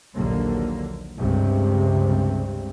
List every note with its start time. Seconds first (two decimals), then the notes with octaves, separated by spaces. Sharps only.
0.15 A#1 D#2 D3 F#3 A#3
1.16 C#2 G2 C3